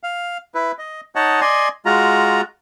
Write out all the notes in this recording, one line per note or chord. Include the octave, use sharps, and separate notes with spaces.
F5
E4 B4
D#5
D#4 C#5 D#5 F#5 A5
D5 D#5 G#5 C6
G#3 F4 F#4 A#5